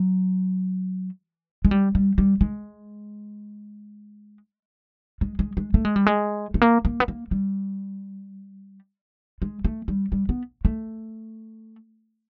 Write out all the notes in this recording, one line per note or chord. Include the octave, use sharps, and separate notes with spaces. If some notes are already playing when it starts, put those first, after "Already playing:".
Already playing: F#3
G#3
G3
G3
G3
G#3
G#3
G#3
G#3
A3
G#3
G3
G#3
A3
A#3
A#3
B3
A#3
G3
G#3
A3
G3
G3
B3
A3